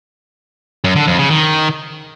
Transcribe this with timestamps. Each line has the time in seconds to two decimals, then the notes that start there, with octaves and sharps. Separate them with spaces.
0.84 F#2
0.96 D3
1.07 F2
1.19 C#3
1.30 D#3